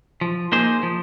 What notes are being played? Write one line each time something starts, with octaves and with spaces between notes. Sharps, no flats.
F3
A#3 D#4 G#4 C5
F3